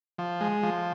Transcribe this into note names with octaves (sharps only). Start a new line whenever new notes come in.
F3
G#3
F3